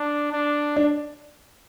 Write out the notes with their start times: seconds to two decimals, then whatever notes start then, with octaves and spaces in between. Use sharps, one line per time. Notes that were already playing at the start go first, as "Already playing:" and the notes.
Already playing: D4
0.32 D4
0.76 D4